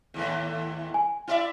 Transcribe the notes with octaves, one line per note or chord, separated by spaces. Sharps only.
D#2 A2 E3
G#5
E4 D5 E5